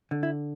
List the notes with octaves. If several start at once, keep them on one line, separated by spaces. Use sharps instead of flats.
D3
E4